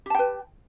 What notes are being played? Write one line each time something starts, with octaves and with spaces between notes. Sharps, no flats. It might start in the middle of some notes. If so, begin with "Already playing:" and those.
G4 B4 G5 A5